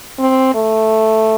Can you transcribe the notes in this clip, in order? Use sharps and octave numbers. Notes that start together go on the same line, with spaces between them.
C4
A3